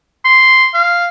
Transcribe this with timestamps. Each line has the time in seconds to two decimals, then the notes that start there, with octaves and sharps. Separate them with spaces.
0.25 C6
0.74 F5